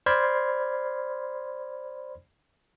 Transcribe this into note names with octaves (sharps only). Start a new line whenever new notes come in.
C5 D5 B5 C6 F6 G#6